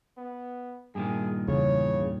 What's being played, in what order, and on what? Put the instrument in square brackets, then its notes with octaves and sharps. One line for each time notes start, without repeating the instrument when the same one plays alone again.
[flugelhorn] B3
[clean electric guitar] G2 A#2 D#3 [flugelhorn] G#4
[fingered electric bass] E2 [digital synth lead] C#3 [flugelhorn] C#5